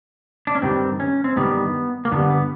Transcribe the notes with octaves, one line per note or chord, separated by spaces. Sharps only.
D4
C#4
G2 D#3 G3 C4
C#4
C4
G2 D#3 G3 B3
A#3
G2 D3 G3 B3
B3